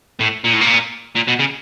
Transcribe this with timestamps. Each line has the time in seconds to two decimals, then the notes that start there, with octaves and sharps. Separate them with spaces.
0.20 A2
0.45 A#2
0.53 A2
0.61 A#2
1.16 A#2
1.28 B2
1.39 C#3